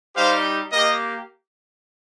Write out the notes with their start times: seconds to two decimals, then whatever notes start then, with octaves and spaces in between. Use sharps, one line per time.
0.15 G3 D#4 G4 C5 F5
0.71 A#3 G4 A#4 D#5